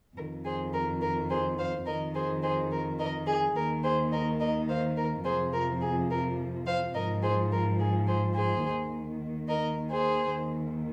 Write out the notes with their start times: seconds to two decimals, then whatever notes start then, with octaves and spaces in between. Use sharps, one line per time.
0.16 F2 A#4
0.21 D#3
0.44 G#4 C5
0.73 A#4
1.01 A#4
1.29 G#4 C5
1.58 C5 F5
1.85 F2 D#3 A#4 D#5
2.14 G#4 C5
2.42 G#4 C5
2.70 A#4
2.99 A#4 D#5
3.27 G#4
3.55 D#2 D#3 A#4
3.83 G#4 C5
4.11 A#4 D#5
4.39 A#4 D#5
4.69 C5 F5
4.96 A#4
5.24 F2 C3 F3 G#4 C5
5.53 A#4
5.81 G#4
6.10 A#4
6.66 C5 F5
6.93 G#2 F3 A#4 D#5
7.22 G#4 C5
7.51 A#4
7.79 G#4
8.06 G#4 C5
8.35 G#4 C5
8.64 D#2 D#3
9.48 A#4 D#5
9.90 G#4 C5
10.33 D#2 D#3